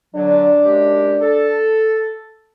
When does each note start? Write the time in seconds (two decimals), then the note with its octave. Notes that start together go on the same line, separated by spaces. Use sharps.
0.15 D3 F#3 D4
0.64 F#2 G#3 G4
1.21 A4